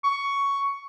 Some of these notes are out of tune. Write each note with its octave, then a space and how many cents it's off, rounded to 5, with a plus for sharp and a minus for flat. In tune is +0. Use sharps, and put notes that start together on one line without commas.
C#6 +10